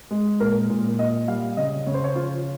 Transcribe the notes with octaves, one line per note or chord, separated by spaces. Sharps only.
G#3
A#2 A#4
A#2
A#2 D#5
G3 F5
C#3 D#5
C#3 C#5
C5
C#5
F3 F4